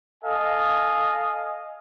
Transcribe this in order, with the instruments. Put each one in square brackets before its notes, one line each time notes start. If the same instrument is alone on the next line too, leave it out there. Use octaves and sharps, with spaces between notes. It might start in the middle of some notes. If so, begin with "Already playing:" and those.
[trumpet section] A4 D#5 F5 G#5